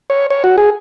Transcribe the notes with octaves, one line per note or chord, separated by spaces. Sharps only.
C#5
C#5
F#4
G#4